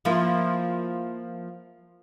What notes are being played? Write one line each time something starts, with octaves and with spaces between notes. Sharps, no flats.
F3 A#3 E4